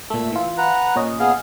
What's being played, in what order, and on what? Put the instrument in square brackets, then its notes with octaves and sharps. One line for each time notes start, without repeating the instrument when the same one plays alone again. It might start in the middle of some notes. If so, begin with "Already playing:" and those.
[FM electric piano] A#2 A3 [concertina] E5 E6
[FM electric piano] E3 F4
[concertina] B4 F#5 A#5
[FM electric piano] A#2 C#4 D#5
[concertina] B3 G#4 F5